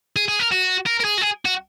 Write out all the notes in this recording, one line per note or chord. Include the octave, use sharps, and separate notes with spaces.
G#4
G#4
A#4
F#4
A#4
A#4
G#4
F#4
G#4
F#4